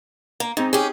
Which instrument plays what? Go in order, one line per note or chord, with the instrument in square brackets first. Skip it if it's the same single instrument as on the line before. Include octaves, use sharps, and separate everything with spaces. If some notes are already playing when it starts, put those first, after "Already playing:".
[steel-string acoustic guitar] A#3
[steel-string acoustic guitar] G#2 [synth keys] C4 D#4
[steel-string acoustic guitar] C#4 G4 [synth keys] G#4